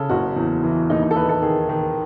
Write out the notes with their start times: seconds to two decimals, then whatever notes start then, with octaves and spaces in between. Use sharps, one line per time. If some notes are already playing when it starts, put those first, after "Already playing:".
Already playing: C#3 A4
0.09 F#1 F#4
0.36 E2
0.63 E3
0.90 D#2 D#4
1.03 D#4
1.11 A4
1.16 D#2 B4
1.29 A4
1.42 D#3 G#4
1.69 D#3